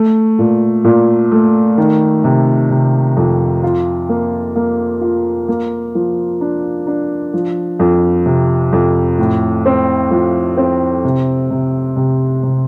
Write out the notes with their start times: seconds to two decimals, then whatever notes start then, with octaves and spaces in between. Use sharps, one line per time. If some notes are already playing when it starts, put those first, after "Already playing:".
Already playing: A3
0.39 A#2
0.84 A#2
1.31 A3
1.78 D#3
2.24 C3
2.70 C3
3.17 F2
3.63 F4
4.09 A#3
4.56 A#3
5.01 F4
5.48 A#3
5.95 F3
6.41 D4
6.87 D4
7.33 F3
7.79 F2
8.26 C3
8.72 F2
9.18 A2
9.66 C4
10.11 F3
10.57 C4
11.04 C3
11.51 C3
11.96 C3
12.43 C3